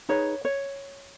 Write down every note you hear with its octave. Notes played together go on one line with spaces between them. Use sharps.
D#4 G#4 B4 C#5
C#5